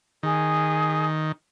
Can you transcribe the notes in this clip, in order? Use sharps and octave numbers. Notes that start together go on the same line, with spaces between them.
D#3 G#4